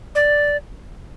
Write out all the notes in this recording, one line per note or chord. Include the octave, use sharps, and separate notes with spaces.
D5